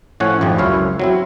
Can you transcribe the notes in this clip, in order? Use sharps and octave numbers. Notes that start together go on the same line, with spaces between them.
A2 F3 C#4 C#5 F#5
G#1 F2 F3 G3
C#2 F#2 E4 C#5 F5
F#3 C4 E4